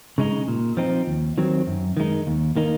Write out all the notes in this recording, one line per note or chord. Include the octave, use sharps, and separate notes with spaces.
C#3 G#3 D#4
A#2
F3 C4 D#4
D#2
D#3 F#3 C4
F#2
D#3 G#3 D#4
D#2
D#3 A#3 D#4